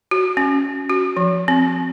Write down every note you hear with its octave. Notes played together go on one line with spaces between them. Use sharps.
F#4
C#4
F#4
F3
C4